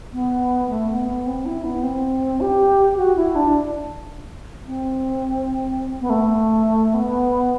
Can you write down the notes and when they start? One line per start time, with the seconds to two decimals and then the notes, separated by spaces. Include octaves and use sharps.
0.13 B3
0.69 A3
0.89 B3
1.08 B3
1.27 C4
1.46 E4
1.64 B3
1.83 C4
2.41 G4
2.97 F#4
3.16 E4
3.35 D4
4.67 C4
6.01 B3
6.10 A3
6.94 B3